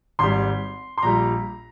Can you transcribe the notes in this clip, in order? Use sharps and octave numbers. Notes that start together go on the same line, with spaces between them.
G#1 G#2 G3 C6
C6
A#1 A#2 G3 A#5